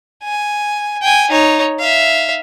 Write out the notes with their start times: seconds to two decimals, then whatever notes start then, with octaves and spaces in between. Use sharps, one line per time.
0.24 G#5
1.02 G5 G#5
1.31 D#4 C#5
1.79 E5 F5